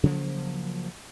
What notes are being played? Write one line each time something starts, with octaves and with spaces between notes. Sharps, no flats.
C#3 F3 F#3 A#3